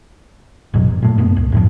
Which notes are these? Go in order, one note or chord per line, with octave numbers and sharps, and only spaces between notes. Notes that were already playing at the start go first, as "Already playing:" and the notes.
A1 F2 B2 F#3
F#1
A#2 A3
F#2 A#2 B3
C#2
F#2 A2 F3